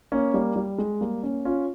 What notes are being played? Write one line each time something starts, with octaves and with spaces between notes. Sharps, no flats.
A#3 C#4
G3 A#3
G3
G#3
G3 A#3
A#3 C#4
C#4 F4